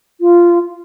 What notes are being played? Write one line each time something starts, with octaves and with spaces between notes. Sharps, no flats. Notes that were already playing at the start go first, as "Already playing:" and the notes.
F4